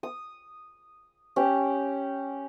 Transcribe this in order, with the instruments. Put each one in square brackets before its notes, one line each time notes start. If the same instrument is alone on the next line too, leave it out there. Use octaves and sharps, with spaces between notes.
[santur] D#6
C#4 G4